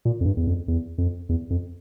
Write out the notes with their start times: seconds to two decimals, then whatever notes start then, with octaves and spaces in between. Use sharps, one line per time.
0.05 A#2
0.21 F2
0.25 G2
0.37 E2
0.47 F2
0.68 E2
0.98 F2
1.29 E2
1.50 F2